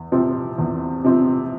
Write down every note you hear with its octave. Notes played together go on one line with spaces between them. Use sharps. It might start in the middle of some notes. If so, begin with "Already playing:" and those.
Already playing: E2
C3 F3 C4
E2
C3 F3 C4